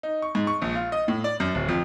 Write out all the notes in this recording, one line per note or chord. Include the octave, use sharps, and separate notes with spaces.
D#4
C#6
G#2
C#6
A#1
F4
D#5
A2
D5
F#2
D1
F2